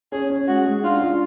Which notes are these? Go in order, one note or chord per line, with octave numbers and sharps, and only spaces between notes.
C#4 G#4
C#4
G#3 F#4
G#3
D4 F4
F4